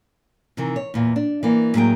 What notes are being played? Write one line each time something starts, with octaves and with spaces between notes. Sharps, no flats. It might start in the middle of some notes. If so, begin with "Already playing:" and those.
C3 D#3 E3
C#5
E2 A#2
D4
E3 A#3
A2 F#3 A#3 G#4 G5